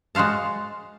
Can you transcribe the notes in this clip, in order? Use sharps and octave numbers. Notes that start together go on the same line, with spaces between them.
G#3 F#4 C5 F5 A5